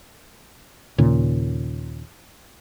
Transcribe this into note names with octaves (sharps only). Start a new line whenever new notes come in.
D#2 A#2 C#3